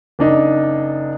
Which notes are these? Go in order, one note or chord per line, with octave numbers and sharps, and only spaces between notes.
F#1 D4 D#4